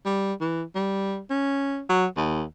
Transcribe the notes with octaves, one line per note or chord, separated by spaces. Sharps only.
G3
E3
G3
C#4
F#3
D#2